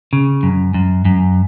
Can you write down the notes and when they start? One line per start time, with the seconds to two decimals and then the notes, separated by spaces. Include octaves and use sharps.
0.13 C#3
0.43 F#2
0.74 F#2
1.05 F#2